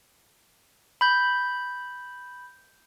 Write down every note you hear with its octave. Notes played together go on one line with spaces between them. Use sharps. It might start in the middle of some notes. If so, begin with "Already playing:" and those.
B5 G6